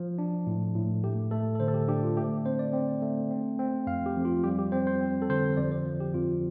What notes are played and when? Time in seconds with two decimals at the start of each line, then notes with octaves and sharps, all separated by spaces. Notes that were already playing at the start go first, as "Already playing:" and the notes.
Already playing: F3
0.18 D4
0.47 A2
0.75 A2
1.04 A3 G4
1.31 A3 A4
1.55 A4
1.60 D3 C5
1.68 A4
1.74 G4
1.88 D4 G4
2.03 F4
2.17 A3 G4
2.45 C4 C5
2.59 D5
2.73 C4
3.02 A3
3.31 C4
3.59 C4
3.87 F2 F5
4.06 G4
4.16 F2
4.25 F4
4.44 G3 G4
4.58 G4
4.72 C4 C5
4.87 C5
5.01 C4
5.22 A4
5.30 D3 C5
5.57 F2 D5
5.72 C5
5.86 F3
6.00 G4
6.14 F2 F4